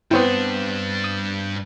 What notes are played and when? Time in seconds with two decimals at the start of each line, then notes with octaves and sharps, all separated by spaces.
0.11 G2 B3 C4 D4 E4 C#5 G5
1.04 D#6